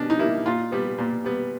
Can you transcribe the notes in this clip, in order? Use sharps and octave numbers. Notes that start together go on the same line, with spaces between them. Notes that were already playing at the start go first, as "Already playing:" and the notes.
Already playing: B2 G3 A#3 C#4 D4
D#4
G3 A#3 E4
A#2 F4
G3 B3
A#2
G3 B3